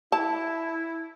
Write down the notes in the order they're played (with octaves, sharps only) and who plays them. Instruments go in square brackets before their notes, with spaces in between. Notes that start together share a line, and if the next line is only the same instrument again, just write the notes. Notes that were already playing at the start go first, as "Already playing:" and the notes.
[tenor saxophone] E4 [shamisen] A5